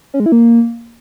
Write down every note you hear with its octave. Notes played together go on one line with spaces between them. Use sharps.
C#4
G#3
E4
A#3